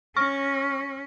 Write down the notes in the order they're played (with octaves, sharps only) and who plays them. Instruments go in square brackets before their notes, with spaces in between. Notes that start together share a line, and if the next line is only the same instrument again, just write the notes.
[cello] C#4 [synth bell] C#6 F6 A#6